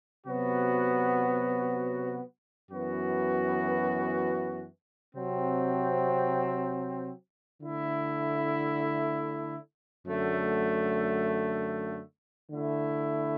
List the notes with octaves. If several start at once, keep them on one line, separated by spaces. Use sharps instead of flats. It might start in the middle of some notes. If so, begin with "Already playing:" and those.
C3 F#3 B3 F#4
F#2 E3 B3 F#4
C3 F#3 C4
D3 A3 E4
F#2 D3 A3
D3 A3 E4